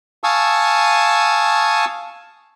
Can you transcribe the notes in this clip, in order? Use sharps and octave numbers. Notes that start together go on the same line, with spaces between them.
F5 G#5 A5 C#6 D#6 E6